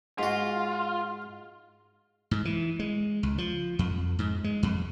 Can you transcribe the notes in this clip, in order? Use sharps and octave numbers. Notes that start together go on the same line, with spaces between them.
G#2 F4 F#4
G#2
E3
G#3
C#2
F3
F2
G#2
G#3
F2